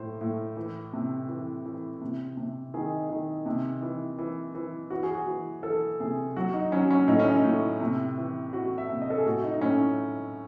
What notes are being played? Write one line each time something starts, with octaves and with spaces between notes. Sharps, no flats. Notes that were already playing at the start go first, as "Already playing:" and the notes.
Already playing: A2 C5
A2
E3
C3
E3
E3
C3
C3
D#3 G#4
D#3
C3
E3
E3
E3
E3 F#4
G#4
F#4
E3
E3 A4
C3 G#4
F#3 F#4
D#4
F#3 C#4
C#4
A2 D#4
C#4
D#4
A2
C3
E3
E3 F#4
E5
C3
D#5
A4
G#4
A2 F#4
D#4
D#4
A2 C#4